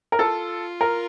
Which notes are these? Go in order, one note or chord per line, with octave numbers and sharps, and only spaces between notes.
A#4
F4 A4
A#4